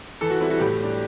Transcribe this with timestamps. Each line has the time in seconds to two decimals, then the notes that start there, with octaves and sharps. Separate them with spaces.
0.21 E3 A4
0.30 F#4
0.41 G3 C4 E4
0.50 F#4
0.60 A2 G4
0.80 G3 D4